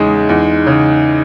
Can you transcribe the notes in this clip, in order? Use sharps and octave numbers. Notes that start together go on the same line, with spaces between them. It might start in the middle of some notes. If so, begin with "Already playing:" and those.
Already playing: E2 C#3 G#3 C#4 D#4
E2
C#3